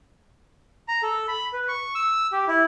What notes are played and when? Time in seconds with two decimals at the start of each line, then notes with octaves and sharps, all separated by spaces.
0.88 A#5
1.03 A4
1.28 B5
1.53 B4
1.68 C#6
1.95 E6
2.32 G4
2.47 E4